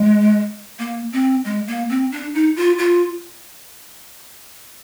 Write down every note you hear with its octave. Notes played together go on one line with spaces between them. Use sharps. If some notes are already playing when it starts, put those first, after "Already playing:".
Already playing: G#3
A#3
C4
G#3
A#3
C4
D4
D#4
F4
F4